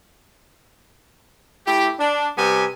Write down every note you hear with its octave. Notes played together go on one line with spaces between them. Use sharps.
A3 E4 G4
D4
C3 G3 B3 G4 G#5